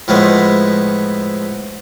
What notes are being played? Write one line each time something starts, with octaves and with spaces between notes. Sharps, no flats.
A2 F3 G#3 A3 B3